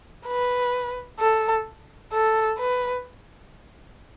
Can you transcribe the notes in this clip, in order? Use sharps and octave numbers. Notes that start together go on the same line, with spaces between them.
B4
A4
A4
B4